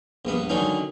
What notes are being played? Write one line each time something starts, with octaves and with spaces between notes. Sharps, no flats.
A#1 G2 B3
D3 D#3 F#3 C#4 D#4